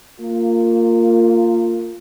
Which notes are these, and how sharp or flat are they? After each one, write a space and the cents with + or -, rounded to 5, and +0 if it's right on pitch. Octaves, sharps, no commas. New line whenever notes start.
A#3 -25 F4 +0